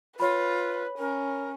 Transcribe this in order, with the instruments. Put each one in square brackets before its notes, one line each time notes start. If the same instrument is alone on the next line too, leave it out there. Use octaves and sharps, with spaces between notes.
[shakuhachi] F4 [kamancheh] B4 [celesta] C#5 B5
[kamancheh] C#4 [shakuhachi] A#4